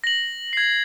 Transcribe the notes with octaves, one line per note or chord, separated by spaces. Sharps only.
A#6 F#7
G#6 C7